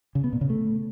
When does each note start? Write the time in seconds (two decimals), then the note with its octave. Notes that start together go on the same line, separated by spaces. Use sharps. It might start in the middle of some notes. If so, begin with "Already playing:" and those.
0.15 C#3
0.24 B3
0.33 A#2
0.41 C#3
0.50 A3